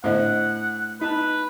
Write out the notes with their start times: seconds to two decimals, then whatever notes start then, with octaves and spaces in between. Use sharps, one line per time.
0.04 A2 D3 A3 C5 D#5 F#5
1.01 D#4 B4 A5